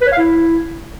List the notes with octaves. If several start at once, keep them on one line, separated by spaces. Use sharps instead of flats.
B4
C#5
F5
E4